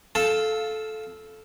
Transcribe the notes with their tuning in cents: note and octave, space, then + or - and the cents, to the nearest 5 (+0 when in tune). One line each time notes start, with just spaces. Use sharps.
F4 +0 A4 -15 A5 +0